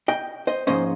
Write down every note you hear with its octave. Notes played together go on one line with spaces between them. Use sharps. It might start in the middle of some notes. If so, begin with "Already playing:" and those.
D#5 G5
C5 D#5
G#2 F3 A#3 C#4 C5 D#5